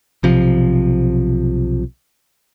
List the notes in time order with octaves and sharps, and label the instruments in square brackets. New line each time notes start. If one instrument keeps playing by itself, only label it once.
[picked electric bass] B1 C3 F3